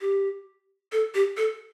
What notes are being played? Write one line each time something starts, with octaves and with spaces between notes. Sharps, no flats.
G4
A4
G4
A4